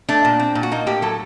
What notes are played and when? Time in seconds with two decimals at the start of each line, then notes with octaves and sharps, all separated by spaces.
0.09 A3 D4
0.25 A#2
0.39 C4
0.55 A#2
0.63 F#4
0.71 A#3 D#4
0.87 A2 G4
1.02 F#3 A4